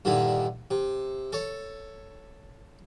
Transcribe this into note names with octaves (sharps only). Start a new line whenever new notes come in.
G2 A#2 D3 D#3 E4
C3
A4 C#5